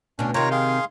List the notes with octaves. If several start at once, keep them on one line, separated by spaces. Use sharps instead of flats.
D2 B2 C#4 D4
C3 D#3 F4 C#5 A#5
G#4 F5 C6